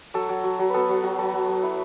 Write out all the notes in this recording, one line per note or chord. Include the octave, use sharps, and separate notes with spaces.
F#3 A4
F#3
F#3
F#3
B3 A4 B4
F#3
F#3 F#4
F#3 A4
F#3 F#4
F#3
E4